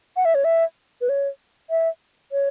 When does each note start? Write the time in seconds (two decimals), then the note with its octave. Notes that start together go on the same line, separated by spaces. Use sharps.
0.17 F#5
0.25 E5
0.35 C#5
0.44 E5
1.01 B4
1.09 C#5
1.70 E5
2.32 C#5